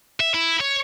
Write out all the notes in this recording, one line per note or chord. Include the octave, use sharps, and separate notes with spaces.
E5
E4
C#5